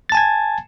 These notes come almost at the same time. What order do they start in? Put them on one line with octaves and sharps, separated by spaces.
A6 A5 G#5 G#6